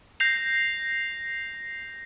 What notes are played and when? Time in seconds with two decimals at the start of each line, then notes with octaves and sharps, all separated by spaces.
0.20 G6 A#6 C7 F7